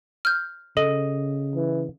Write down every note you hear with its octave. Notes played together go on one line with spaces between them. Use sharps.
F6 G6
C#3 A4 D#5
E3